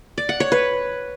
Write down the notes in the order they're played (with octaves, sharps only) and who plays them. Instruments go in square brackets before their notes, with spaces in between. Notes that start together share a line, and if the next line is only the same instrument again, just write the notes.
[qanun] D5
F#5
C#5
B4